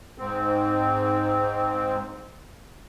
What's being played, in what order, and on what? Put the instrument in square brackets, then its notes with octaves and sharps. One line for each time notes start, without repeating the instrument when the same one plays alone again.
[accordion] G#2 C4